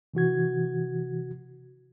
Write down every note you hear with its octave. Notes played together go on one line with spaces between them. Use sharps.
C3 E3 F#4 G#6